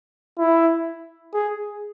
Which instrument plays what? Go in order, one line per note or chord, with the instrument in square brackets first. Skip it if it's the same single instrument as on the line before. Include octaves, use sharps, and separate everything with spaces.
[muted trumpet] E4
G#4